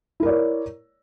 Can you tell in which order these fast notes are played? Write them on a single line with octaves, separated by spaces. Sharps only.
E4 A#4 D5 C#5